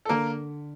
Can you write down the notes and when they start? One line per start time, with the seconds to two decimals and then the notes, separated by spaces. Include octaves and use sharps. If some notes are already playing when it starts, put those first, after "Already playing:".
0.05 A4
0.09 D3 A#3 A#4